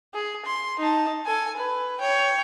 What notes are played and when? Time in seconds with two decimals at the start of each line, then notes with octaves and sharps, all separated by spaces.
0.14 G#4
0.45 C6
0.79 D#4 A5
1.25 A4 G#5
1.57 B4
1.99 C#5 G5